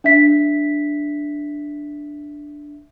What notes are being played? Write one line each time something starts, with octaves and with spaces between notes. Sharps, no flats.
D4 E5 B6